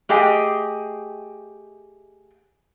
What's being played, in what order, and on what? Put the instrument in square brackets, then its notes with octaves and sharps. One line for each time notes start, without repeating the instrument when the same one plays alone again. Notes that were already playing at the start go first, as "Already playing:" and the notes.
[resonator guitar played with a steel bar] A3 G4 G#4 D#5 G5